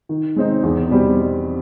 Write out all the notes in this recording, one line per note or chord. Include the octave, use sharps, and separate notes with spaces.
D#3
G#3 C4 D#4
E2
B2 G3 C4